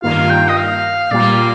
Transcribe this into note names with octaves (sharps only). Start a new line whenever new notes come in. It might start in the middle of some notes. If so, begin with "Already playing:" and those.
G2 D#3 A#3 F4 F5
G5
D#5
F5
A#2 G3 A#3 F4 D5